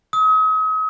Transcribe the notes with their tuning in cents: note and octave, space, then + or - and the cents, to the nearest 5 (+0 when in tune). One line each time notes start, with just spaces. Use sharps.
D#6 +40